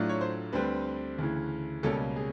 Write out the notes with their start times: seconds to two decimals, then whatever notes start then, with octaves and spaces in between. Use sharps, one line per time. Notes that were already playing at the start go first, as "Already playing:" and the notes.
Already playing: A2 F#3 A3 D4 F4
0.09 C#5
0.21 C5
0.53 D2 D3 G3 C4 B4
1.18 D2 C#3 E3
1.83 C#2 B2 G3 A#3 C#4 A4
2.16 G#4